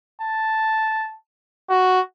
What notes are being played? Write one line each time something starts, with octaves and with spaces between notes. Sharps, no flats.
A5
F#4